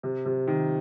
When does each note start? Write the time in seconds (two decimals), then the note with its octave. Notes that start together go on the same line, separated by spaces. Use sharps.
0.03 C3
0.26 C3
0.47 D#3